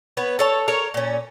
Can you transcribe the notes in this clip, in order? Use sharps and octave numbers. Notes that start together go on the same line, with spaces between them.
B3 B4 C#5
A4 C#5 A5
A4 A#4 C#5
A#2 C#4